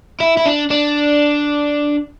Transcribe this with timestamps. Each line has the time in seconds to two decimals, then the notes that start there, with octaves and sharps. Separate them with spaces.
0.20 E4
0.37 E4
0.46 D4
0.71 D4